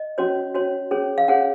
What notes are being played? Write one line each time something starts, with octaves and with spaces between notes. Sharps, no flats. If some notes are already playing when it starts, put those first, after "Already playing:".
Already playing: D#5
C#4 F#4 C#5
C#4 F#4 C#5
C#4 G#4 C#5
F5
C#4 G#4 C#5 F#5